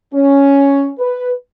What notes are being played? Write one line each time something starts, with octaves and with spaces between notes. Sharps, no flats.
C#4
B4